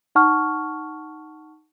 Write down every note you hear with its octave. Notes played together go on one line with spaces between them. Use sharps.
D#4 F#5 A5 C#6 F6